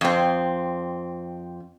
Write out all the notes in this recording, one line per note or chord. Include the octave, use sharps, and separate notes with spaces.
F2 C4